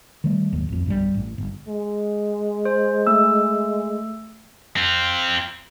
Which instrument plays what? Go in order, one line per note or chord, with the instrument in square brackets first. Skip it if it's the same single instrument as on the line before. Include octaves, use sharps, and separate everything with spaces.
[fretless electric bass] D#3 G3 A3
G#1 D#2 D#3 F#3
A1 F2
B1 G2 E3 G3
A1
G1
[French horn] G#3
[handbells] C5
A3 E6
[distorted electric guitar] C4 F4